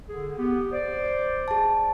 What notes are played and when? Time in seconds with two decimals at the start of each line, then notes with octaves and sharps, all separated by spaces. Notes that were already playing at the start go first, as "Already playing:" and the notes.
0.09 D3 G#4
0.37 B3 G4
0.72 C5 D5
1.48 G#4 A5